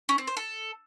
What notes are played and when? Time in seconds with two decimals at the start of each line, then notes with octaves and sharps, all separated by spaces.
0.09 C#4
0.18 C4
0.27 C5
0.37 A4